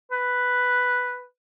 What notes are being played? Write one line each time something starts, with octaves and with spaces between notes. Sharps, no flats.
B4